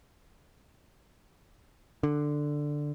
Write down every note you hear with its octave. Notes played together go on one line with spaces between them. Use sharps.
D3